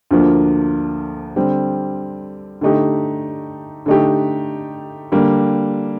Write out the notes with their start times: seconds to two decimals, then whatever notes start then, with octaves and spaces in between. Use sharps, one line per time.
0.11 D2 D3 F3 A#3
1.36 D3 G3 C4
2.61 D3 A3 D#4 G4
3.86 D3 A3 D#4 G4
5.12 D3 G3 A#3